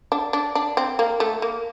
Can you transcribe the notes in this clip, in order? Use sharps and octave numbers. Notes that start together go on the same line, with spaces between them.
D4
D4
D4
C4
A#3
A3
A#3